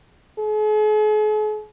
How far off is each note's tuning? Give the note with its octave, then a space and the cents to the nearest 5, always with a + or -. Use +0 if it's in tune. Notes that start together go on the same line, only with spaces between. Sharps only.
G#4 +45